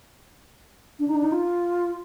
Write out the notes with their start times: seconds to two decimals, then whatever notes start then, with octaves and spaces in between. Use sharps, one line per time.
0.99 D4
1.08 D#4
1.15 D4
1.24 D#4
1.32 F4